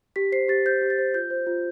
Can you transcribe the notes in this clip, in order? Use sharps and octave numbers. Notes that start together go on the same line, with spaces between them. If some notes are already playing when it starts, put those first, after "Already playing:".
G4 B6
C5 C7
G4 A6
C5 G6
G4
A6
C5
F4 G6
C5
F4